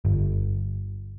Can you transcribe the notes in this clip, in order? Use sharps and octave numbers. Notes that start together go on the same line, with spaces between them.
G1